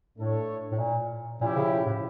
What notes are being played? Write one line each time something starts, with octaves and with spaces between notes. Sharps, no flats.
A2 A3 D4 A4 C#5
A2
A#2
A#2 F3 C#4 E4 G4
C#3
A2